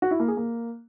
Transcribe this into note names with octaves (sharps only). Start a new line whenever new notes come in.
F#4
E4
A#3
G#4
A#3